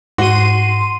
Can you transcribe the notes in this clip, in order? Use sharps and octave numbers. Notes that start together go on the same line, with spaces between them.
G#2 F#4 C6 D#7